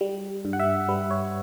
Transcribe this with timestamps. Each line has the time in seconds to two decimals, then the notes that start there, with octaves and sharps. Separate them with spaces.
0.01 G3
0.45 G2
0.53 F#5
0.59 E5
0.88 G3 B4
1.11 C#5